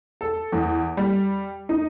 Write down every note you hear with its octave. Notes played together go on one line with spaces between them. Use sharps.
A4
E2
G3
D#4